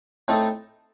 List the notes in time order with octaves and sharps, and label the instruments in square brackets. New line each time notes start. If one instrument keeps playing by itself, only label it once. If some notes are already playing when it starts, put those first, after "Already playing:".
[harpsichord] A2 A3 C4 D#4 A4